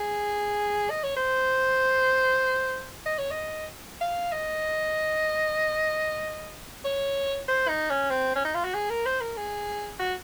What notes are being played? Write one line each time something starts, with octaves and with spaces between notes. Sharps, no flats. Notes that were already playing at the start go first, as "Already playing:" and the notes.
Already playing: G#4
D#5
C#5
C5
D#5
C#5
D#5
F5
D#5
C#5
C5
D#4
C#4
C4
C#4
D#4
F4
F#4
G#4
A#4
C5
A#4
G#4
F#4